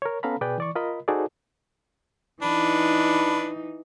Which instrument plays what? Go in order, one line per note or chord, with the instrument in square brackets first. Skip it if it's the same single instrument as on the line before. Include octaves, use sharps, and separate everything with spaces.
[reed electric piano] A#4 C#5
B3 C#4 A4 F5 A#5 B5
B2 G#4 B4 D5 G5
E3 D5 C#6
F4 A#4 D#5 B5
D#4 F#4 G#4 A4 C5 D5
[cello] E3 D#4 [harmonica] D4 B4